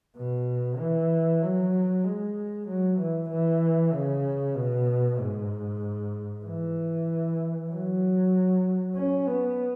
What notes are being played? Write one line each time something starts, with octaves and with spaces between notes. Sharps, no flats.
B2
E3
F#3
G#3
F#3
E3
E3
C#3
B2
G#2
E3
F#3
C#4
B3